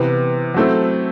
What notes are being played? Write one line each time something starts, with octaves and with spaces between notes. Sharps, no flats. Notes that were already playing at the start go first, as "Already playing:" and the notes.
Already playing: C3 E3 B3
F#3 A3 C4 E4 A4